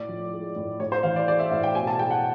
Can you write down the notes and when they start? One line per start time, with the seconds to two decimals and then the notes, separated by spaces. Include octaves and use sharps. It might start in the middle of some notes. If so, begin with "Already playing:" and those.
Already playing: A2 D5
0.09 F3
0.33 G#3
0.56 A2
0.80 A2 C#5
0.92 C5
1.03 E3 F5
1.16 D5
1.27 G#3 D5
1.39 E5
1.51 A2 F5
1.63 G5
1.75 B2 G#5
1.87 A5
1.98 G#3 G5
2.11 F#5